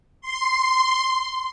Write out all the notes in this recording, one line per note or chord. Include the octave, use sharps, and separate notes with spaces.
C6